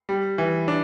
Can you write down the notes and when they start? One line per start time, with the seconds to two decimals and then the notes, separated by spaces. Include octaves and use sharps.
0.09 G3
0.38 E3
0.68 D4